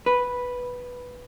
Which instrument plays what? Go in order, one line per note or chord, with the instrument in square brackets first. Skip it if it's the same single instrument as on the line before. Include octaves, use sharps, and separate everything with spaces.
[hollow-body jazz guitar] B4